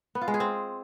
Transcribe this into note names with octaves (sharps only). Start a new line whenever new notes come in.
B3
F4
G#3
G#4
C4